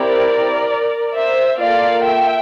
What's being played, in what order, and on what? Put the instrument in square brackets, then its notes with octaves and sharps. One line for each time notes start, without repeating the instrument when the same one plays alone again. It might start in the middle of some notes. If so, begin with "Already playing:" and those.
Already playing: [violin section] C4 E4 G4 A#4 D5
C5 E5
A#3 F4 A4 D5 F5
E5 G5